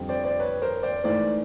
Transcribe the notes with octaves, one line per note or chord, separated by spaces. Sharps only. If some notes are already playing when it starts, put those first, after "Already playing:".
Already playing: F2 D3 G3 C4
C5 D5
C5 D5
B4 C#5
A#4 C5
C5 D5
G#2 E3 A3 C5 D5